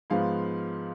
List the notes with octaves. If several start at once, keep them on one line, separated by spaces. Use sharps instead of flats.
G#2 F3 B3 F5